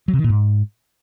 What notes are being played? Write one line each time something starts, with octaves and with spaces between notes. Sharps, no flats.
F#3
C3
D#3
A#2
G#2